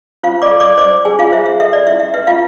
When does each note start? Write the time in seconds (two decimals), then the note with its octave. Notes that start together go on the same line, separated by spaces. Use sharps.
0.23 F4 C5 F5
0.42 D5 D6
0.51 A4
0.60 D5 D6
0.78 C5 D5 D6
1.05 G#4 G#5
1.19 F4 F5
1.32 C5 E5
1.46 E5
1.60 A4 E5
1.73 D5
1.87 E4 E5
2.00 E5
2.14 B4 E5
2.27 F4 F5